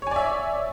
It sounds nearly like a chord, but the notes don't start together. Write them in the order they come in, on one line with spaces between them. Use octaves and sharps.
C#5 G#5 D5 E5